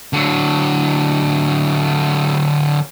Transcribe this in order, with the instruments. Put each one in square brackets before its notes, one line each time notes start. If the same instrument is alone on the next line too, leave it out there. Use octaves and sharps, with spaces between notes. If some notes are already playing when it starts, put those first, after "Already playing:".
[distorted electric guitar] D3 F#3